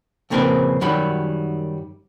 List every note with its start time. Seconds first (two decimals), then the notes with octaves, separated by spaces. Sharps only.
0.30 F2 A#2 C#3 C4 A#4 B4
0.81 F#2 D#3 F#3 G3 B5